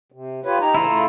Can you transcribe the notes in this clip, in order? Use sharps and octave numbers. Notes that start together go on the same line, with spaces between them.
C3
F4 G4 B4 C#5
D#4 G4 A#5
A2 C#3 E3 E4 F4 A4
C#3 A3